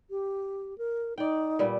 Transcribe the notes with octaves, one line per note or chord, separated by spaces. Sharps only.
G4
A#4
D#4 D5 G5
A#2 G3 B3